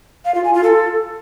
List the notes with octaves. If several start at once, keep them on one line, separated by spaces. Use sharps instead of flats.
F5
F4
G#5
F4
A4